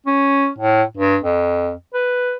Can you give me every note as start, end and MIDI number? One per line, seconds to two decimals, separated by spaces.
0.06 0.48 61
0.58 0.82 45
0.97 1.18 43
1.23 1.72 41
1.94 2.35 71